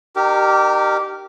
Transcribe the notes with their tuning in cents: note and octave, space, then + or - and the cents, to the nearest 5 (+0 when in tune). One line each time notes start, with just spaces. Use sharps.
D#4 -45 G4 -15 A#4 -10